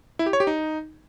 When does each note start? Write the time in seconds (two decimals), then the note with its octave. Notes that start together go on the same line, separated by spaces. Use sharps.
0.19 E4
0.26 G4
0.33 C#5
0.40 G4
0.47 D#4